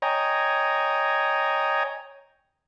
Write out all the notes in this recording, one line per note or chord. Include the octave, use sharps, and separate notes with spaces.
C#5 D#5 G5 G#5 A#5